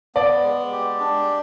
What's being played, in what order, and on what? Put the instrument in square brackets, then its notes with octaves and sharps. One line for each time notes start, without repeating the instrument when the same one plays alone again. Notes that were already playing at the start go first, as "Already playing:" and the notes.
[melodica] B3 [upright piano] D5
[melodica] G#3
G4
D4